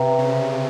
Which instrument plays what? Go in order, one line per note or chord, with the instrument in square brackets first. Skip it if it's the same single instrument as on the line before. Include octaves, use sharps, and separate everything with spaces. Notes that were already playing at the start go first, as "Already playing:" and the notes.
Already playing: [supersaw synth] C3 [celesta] B4 E5 G5 A#5
[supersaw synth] C#3